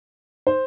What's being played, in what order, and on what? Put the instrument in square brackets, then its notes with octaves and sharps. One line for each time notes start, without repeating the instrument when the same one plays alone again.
[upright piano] C5